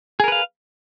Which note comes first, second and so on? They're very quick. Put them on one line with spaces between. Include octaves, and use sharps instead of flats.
G#4 A#4 B4 F5